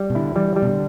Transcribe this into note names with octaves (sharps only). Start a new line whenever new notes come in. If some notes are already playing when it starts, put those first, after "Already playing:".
Already playing: G3
B2
D3 E4
E3 G3
G3
B2
D3